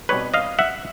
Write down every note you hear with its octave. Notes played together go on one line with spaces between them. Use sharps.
B2 G3 C4 D#4 B4 C#5
D#5 F5
E5 F#5